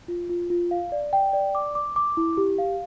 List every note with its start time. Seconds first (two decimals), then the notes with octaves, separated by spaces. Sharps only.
0.08 F4
0.29 F4
0.50 F4
0.71 F5
0.92 D5
1.13 G5
1.33 D5
1.55 D6
1.75 D6
1.96 D6
2.17 E4
2.37 G4
2.58 F5